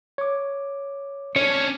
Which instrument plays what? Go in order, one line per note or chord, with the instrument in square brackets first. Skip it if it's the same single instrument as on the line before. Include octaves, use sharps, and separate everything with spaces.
[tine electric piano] C#5 D6
[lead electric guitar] C#4 D4 [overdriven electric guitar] C#5 [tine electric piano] C#7